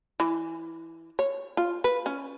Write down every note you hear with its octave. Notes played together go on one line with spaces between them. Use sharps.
E3
C#5
F4
B4
C#4